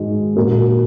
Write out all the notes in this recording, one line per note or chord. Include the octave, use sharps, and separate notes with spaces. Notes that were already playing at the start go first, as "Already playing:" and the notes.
Already playing: G#2 D#3 G#3 F#4
A#2 A#3 F#4 A#4